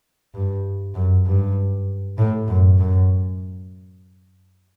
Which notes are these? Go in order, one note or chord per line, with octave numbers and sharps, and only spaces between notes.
G2
F#2
G2
A2
F#2
F#2